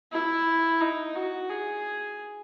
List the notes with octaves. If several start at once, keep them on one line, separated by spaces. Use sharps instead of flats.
E4
D#4
F#4
G#4